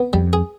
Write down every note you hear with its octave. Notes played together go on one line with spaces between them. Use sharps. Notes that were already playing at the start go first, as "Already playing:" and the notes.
Already playing: B3
F2 G3
G#4